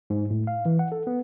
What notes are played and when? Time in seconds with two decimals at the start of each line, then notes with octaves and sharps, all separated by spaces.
0.10 G#2
0.30 A2
0.47 F5
0.65 E3
0.79 F#5
0.92 A4
1.07 B3